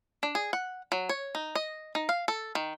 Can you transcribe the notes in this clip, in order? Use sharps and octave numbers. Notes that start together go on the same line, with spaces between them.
D4
G#4
F#5
F#3
C#5
D#4
D#5
D#4
F5
A4
D#3